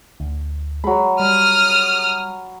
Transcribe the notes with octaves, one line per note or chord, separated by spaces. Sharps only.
D2
F#3 G#3 B5
G3 D#6 F6